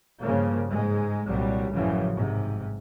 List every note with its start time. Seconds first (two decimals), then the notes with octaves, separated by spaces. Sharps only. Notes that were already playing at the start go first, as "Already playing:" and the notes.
0.21 G2 C#3 F3 A#3
0.72 G#2 G#3
1.27 C2 A#2 F#3 G3
1.72 A1 F#2 C#3 E3 F3
2.15 G#2 C3